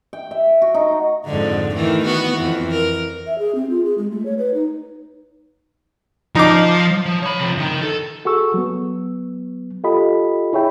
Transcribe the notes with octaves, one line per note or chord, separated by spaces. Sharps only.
G5
E5
F#4
D#4
F2 G#2 D3
D#3 E3 A3
B3 F#4
F2 E3
A#4
E5
G#4
C4
F4
G#4
G#3
A3
C#5
B4
D#4
F3 D#4 D6
F3
C#5 B5
C3 F3
D#3 D#4
A4
F#4 G#4 A4 C#6 E6
F#3 B3
F4 G4 A4 D#5 B5
E4 G#4 C#5 E5 G5 B5